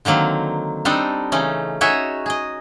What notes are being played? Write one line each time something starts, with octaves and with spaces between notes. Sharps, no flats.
D3 D#3 F#3 A#3 C4
G3 C4 D4 D#4 A4 D#5
C#3 E3 A3 C#4 D#4
D#4 F#4 G#4 C#5 D#5 E5
G#4 D#5